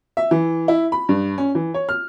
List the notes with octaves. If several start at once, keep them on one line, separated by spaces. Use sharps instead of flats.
E5
E3
E4
B5
G2
C#4
E3
C#5
F6